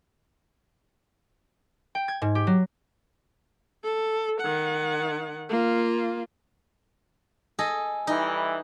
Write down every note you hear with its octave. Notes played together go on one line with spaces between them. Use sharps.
G5
G#6
G#2
G4
F#3
A4
D#3 F#5
A#3 F4
G#4 A4 D#5
E3 G3 D#4 E4